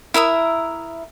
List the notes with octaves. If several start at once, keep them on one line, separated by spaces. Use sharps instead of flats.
E4 A#4 E5 D#6